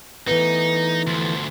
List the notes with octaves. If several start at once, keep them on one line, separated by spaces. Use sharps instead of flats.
E3 A3 B3 D#4
D2 F3